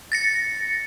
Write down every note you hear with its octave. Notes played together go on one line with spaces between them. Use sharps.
A6 A#6 C#7